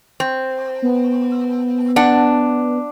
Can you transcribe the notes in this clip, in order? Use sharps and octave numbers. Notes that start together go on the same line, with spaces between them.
C4
B3
D4 F#5